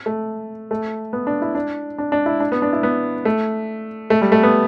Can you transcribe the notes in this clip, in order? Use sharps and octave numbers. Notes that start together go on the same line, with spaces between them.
A3
A3
B3
D4
E4
D4
D4
D4
E4
D4
B3
D4
E4
B3
A3
A3
G3
A3
B3